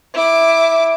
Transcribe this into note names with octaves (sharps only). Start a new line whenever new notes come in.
E4 D6